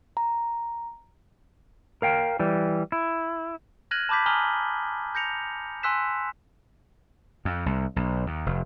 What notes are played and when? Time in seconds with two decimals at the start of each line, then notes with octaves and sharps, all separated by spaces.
0.17 A#5
2.02 A#4 F5 G5
2.39 E3 G3
2.92 E4
3.91 F6 F#6 G#6 A#6 D#7 F#7
4.09 A5 B5 D6 G6 B6
4.26 G#5 A#5 D#6 F6 F#7 G7
5.15 G6 A#6 C#7 F7
5.83 G#5 C6 E6 F#6 B6 E7
7.45 F2
7.66 C2
7.96 B1
8.26 D#2
8.46 F1